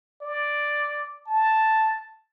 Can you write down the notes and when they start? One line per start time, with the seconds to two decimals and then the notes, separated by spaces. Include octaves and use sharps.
0.22 D5
1.27 A5